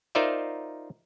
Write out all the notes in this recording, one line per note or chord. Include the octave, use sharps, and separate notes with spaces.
D#4 F4 A#4 C5 D5 E5